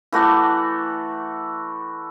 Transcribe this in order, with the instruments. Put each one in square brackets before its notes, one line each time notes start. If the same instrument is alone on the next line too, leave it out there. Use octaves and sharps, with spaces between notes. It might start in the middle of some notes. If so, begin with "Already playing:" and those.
[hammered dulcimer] E3 A3 F#4 D5